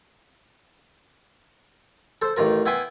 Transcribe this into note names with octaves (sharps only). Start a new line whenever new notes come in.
A4 C5
A1 D#3 F4 A#4
B3 E4 G5 G#5 C6